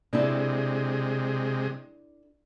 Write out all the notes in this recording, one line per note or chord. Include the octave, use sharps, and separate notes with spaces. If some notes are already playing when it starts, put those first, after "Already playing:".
C3 G#3 D4 E4 A4